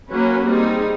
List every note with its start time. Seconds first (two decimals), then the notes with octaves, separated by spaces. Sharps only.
0.11 F#3 A#3 C#4 F#4 B4
0.47 G3 C4 D#4 G#4